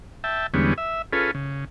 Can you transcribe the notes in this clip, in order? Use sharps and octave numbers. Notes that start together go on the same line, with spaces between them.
E5 G5 A5
E2 D3 G3 G#3 B3 C#4
E5
C#4 F4 G#4 A4 B4
C#3